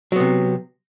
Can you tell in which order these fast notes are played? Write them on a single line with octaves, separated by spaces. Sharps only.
F#3 B3 C3